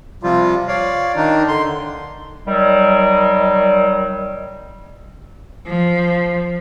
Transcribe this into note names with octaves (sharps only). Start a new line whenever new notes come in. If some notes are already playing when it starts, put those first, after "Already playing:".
C3 F3 G3 F4
C#5 D5 F5
D#3 D4 D#4
D3 C6
D#3 F#3 G3
F3